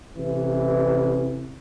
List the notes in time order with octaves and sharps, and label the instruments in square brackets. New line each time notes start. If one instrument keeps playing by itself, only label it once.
[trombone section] A1 C3 E3